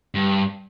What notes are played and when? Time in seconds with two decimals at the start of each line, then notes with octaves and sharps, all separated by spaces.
0.15 G2